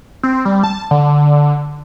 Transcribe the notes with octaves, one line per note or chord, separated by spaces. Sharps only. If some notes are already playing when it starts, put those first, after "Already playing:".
C4
G3
A5
D3